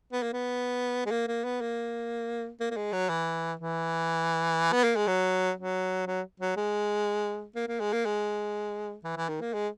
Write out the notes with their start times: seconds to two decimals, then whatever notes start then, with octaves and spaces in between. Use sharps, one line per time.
0.12 B3
0.22 A#3
0.33 B3
1.06 G#3
1.11 A#3
1.27 A#3
1.44 B3
1.61 A#3
2.60 A#3
2.70 A#3
2.77 G#3
2.93 F#3
3.09 E3
3.59 E3
4.72 B3
4.84 A#3
4.96 G#3
5.07 F#3
5.57 F#3
6.07 F#3
6.40 F#3
6.56 G#3
7.55 A#3
7.68 A#3
7.80 G#3
7.93 A#3
8.05 G#3
9.04 E3
9.16 E3
9.29 D#3
9.41 A#3
9.53 G#3